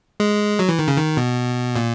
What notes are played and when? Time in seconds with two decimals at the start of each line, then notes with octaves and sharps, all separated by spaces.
0.20 G#3
0.59 F#3
0.69 E3
0.79 D#3
0.88 C#3
0.98 D#3
1.17 B2
1.76 A#2